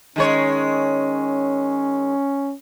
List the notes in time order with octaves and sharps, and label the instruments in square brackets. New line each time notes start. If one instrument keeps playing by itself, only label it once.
[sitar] D#3 G#3 C#5 [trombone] C#4